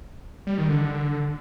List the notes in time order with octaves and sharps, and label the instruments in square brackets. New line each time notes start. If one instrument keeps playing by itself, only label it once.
[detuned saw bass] G3
D#3
D3